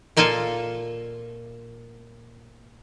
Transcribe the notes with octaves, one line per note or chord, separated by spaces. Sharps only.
A#2 A#3 F4 A4 G#5